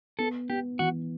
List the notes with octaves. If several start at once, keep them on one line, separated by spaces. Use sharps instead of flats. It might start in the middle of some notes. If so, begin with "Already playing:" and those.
B3 A4
B3 G4
E3 F#4